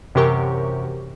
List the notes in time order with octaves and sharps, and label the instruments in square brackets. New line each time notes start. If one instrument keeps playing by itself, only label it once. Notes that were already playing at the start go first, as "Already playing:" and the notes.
[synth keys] F#2 C3 E3 G4 A#4 C#6